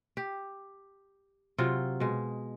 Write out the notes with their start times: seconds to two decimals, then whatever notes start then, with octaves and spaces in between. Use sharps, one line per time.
0.17 G4
1.58 C3 F#3 F4
2.00 B2 G#3